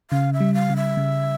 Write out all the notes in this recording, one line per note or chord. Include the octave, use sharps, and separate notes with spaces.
C#3 F5
E5
G3
F5
C#3
E5
C#3